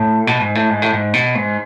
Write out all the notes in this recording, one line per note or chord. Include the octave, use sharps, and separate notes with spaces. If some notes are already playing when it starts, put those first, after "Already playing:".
Already playing: A2
B2
G#2
A2
G#2
A2
G#2
B2
G#2